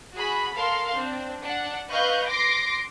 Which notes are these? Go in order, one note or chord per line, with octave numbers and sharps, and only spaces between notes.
F#4 G#4 B5
A4 A#4 F5 C6
C4 D4
D4 F#5
B4 D#5 F5 C#6 F#6 G6
C6 D6 A#6 C7 D7